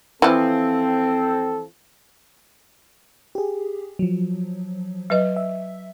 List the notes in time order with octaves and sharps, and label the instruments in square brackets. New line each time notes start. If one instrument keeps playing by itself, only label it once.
[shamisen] E3 F3 [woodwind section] C4 [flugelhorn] A4
[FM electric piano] G4 G#4
F3 F#3
[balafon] F#3 B4 D#5
[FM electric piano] E5